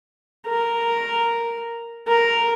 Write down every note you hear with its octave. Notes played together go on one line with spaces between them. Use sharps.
A#4
A#4